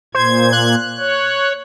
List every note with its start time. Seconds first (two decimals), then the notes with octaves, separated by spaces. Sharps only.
0.15 A#2 C5 G#6
0.53 F#6
0.98 C#5